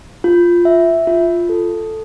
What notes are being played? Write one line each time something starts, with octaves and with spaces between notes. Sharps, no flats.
F4
E5
F4
A4